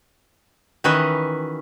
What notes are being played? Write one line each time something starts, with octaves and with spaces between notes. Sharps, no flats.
D#3 E3 C#4 F#4 B4 D#5